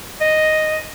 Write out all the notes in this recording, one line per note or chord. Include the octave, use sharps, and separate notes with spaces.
D#5